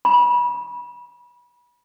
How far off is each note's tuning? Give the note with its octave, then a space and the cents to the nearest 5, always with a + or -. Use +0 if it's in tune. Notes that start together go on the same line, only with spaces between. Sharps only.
B5 -30